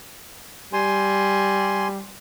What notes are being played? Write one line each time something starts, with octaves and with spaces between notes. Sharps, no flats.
G3 G#5 C6